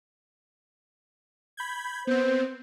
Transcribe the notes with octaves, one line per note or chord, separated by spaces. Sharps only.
B5 G6 G#6
B3 C4 C5